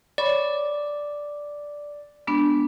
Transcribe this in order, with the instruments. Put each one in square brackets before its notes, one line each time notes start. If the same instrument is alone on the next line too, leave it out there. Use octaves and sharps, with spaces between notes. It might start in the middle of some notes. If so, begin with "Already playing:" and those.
[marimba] C#5 B5 C#6 [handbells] D5
[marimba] G#3 B3 D4